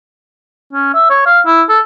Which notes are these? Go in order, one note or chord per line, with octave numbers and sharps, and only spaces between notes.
C#4
E5
C#5
F5
E4
A4